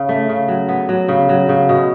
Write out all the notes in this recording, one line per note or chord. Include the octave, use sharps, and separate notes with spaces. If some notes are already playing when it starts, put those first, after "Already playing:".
Already playing: C#3
A3
C#3
F#3
B3
F#3
C#3
F#3
C#3
B2